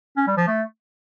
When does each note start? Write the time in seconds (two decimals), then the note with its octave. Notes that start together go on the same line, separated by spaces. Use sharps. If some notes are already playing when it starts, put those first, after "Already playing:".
0.17 C#4
0.27 G3
0.37 F3
0.48 A3